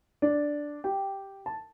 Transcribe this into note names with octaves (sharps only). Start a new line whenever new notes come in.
D4 D5
G4 G5
A5